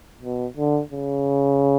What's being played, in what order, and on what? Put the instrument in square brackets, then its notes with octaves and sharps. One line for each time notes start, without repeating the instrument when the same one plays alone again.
[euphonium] B2
D3
C#3